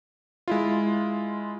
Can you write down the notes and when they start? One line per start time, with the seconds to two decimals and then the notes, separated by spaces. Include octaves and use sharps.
0.48 G#3 E4 F4